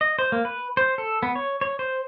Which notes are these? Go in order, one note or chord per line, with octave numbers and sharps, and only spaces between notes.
D#5
C5
A#3
B4
C5
A4
B3
C#5
C#5
C5